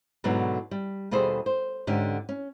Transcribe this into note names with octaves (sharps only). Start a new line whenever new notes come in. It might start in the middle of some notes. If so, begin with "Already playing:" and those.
G#2 B2 D3 F#3 B3
G3
D#2 B2 G3 G#4 A4 C5
C5
G#2 D3 C#4 G4
C#4